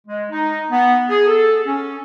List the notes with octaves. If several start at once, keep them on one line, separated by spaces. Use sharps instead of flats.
G#3
D#4
B3
G#4
A4
C#4